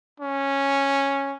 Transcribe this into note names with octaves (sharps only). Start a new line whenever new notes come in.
C#4